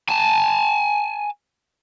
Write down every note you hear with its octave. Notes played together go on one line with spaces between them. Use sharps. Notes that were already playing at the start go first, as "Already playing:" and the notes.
G#5 A5